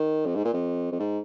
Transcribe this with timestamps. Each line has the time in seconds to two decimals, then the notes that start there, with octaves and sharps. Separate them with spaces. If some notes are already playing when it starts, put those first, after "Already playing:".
Already playing: D#3
0.26 F2
0.35 G#2
0.45 A#2
0.54 F2
0.92 F2
0.99 G#2